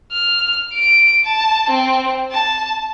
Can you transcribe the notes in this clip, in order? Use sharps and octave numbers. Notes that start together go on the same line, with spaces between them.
F6
D7
A5
C4
A5